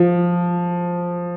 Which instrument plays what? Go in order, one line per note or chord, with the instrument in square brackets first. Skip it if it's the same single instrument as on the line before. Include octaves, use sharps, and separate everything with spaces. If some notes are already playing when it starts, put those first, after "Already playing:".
Already playing: [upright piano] F3